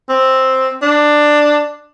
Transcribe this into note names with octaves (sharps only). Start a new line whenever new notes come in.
C4
D4